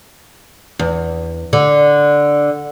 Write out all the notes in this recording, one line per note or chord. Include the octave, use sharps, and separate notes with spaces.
E2
D3